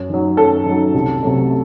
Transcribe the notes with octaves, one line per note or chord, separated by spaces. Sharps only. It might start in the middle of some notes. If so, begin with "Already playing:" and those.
Already playing: F#2
D#3 F#3
F#2 A4
D#3 F#3
C2
C3 F#3 A3